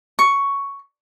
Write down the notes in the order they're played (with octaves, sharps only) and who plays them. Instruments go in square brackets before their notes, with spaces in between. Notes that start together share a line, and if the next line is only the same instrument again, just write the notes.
[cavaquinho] C#6